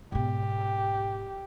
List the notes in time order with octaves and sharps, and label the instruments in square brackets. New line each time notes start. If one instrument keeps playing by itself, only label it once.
[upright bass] G#2 B2 [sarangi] G4